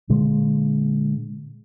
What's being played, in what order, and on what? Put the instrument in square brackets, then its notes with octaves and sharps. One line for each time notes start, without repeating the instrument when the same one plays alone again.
[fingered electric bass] A#2 D3 G#3